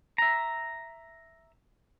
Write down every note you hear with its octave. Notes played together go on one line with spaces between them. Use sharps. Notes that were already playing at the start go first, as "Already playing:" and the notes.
E5 A#5